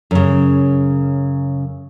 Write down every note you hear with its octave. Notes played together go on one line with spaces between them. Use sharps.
F#2 C#3